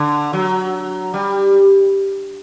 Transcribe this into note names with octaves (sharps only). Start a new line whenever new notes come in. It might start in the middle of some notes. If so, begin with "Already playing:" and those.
Already playing: D3
F#3
G3